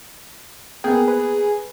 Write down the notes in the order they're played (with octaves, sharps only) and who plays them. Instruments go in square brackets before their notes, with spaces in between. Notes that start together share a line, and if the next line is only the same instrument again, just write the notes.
[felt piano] A#3 B3 [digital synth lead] G#4 [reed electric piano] G5
[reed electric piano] B4